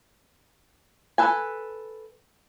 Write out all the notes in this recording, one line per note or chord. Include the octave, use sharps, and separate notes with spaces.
A4 B4 G#5